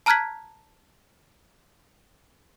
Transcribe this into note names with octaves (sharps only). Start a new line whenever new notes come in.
A5 A#5 F6 F#6 G#6 B6